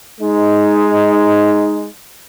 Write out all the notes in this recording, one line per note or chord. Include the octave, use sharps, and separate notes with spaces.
G#3 D#4